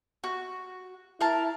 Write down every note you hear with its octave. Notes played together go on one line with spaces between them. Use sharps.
F#4
E4 A#4 A5